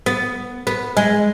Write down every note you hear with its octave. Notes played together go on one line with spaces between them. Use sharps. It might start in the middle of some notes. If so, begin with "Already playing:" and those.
B3
B3
G#3